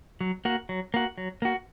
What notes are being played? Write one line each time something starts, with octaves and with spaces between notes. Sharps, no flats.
F#3
A#3 F#4
F#3
A#3 F#4
F#3
A#3 F#4